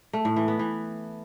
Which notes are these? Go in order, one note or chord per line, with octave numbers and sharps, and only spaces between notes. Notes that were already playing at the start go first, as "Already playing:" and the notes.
A3
A2
E3
B3
E3